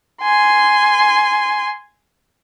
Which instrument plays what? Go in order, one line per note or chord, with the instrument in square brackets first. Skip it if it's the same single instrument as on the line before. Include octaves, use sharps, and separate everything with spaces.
[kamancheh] G#5 C6